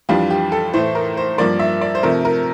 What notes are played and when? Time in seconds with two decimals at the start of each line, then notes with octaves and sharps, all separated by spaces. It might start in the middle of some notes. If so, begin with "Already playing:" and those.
0.09 F2 E3 G3 D4 F4
0.30 G4
0.52 A4
0.73 A2 E3 A3 C5
0.95 A#4
1.17 C5
1.38 G2 F3 A#3 D5
1.59 E5
1.81 D5
1.95 C5
2.03 C3 F3 A3 A#4
2.25 A#4